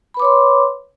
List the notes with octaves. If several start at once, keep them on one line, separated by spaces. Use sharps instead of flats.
B4 C#5 B5 C6 D6